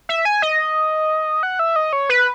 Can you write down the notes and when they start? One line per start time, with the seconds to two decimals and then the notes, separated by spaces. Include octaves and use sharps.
0.09 E5
0.25 G#5
0.42 D#5
1.43 F#5
1.59 E5
1.76 D#5
1.93 C#5
2.09 B4